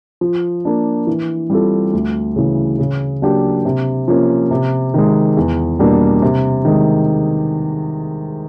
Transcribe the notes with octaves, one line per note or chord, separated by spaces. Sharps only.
F3
A#3 D4
E3
G3 C4 F4 A4
D2
C#3 E3
C#3
F#3 A#3 D4 G4
C3
F3 A#3 C#4
C3
D#3 G#3
E2
B2 G3 A#3 D4
C3
D#3 G#3